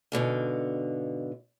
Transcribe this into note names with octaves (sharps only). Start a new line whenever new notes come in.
G#2 B2 D3 F5